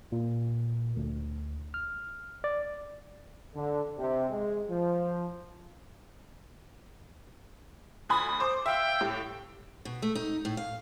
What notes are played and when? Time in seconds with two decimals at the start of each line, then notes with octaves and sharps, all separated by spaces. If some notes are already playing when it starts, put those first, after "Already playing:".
0.12 A#2
0.96 D2
1.74 F6
2.44 D5
3.55 D3
3.97 C3
4.30 G#3
4.70 F3
8.10 D2 G#5 B5 D#6
8.40 C5 D6
8.66 E5 F5 G5
9.01 A2 G4
9.85 B2
10.02 A3
10.15 D#4
10.45 A2
10.57 F5